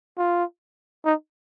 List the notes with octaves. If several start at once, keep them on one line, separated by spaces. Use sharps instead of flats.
F4
D#4